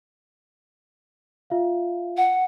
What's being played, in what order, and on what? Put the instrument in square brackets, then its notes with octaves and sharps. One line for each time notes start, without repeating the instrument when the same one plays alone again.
[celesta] F4 E5 F5
[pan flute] F#5